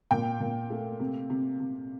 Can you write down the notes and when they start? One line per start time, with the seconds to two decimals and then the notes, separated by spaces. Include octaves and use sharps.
0.11 A#2 G5
0.40 A#2
0.70 A3
1.00 C3
1.30 C3
1.60 C3